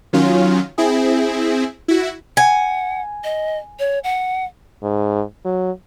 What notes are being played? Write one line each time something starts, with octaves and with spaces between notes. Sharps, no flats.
D#3 F#3 C#4 F4
C4 E4 G#4
E4 F#4
F#5 G#5
D#5
C#5
F#5
G#2
F#3